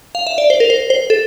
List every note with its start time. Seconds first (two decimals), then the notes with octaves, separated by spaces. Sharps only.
0.15 F5
0.27 E5
0.38 D5
0.50 C5
0.60 A#4
0.70 C5
0.90 C5
1.10 A4